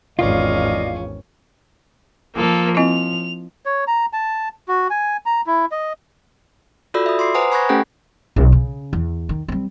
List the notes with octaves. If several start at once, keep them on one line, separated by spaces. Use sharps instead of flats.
G#1 E2 C#4 F4 D5 D#5 F5
F3 A#3 A4
C4 E4 D#5 F7
C#5
A#5
A5
F#4
G#5
A#5
E4
D#5
F4 F#4 A4 D5 B5 E6
E5 D#6
C6 D6 C7
B4 C5 F#5 G#5 A#5 D#6
G#5 B5 C#6 F#6 G#6 A#6
A3 C#4 G4 A4 F#5 G5
B1
C#3
E2
D#3
G3 C4